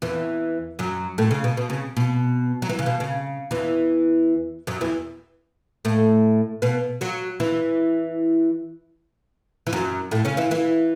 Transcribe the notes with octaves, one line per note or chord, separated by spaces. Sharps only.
E2 E3
F#2 F#3
A2 A3
C#3
B2
B2
C#3
B2
F#3
E3
C#3
B2
C#3
E2 E3
F#2 F#3
E2 E3
A2 A3
B2 B3
F#3 F#4
E3 E4
E3
F#2 F#3
A2 A3
C#3 C#4
E3 E4
E3 E4